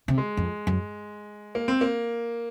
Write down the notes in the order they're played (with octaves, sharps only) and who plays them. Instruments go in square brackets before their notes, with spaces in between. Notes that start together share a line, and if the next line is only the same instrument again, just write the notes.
[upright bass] C3
[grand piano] G#3
[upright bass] F2
F#2
[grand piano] A#3
C4
A#3